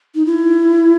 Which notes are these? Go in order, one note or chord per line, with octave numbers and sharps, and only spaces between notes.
D#4
E4